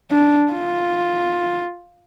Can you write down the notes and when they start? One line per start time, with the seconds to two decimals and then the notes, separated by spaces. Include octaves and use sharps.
0.11 D4
0.52 F4